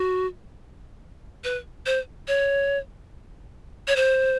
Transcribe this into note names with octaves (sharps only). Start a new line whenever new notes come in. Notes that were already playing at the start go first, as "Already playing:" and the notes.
Already playing: F#4
B4
C5
C#5
C#5
C5